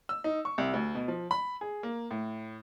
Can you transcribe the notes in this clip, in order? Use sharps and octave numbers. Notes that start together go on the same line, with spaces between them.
E6
D#4
C#6
C2
D2
B2
F3
B5
G#4
A#3
A2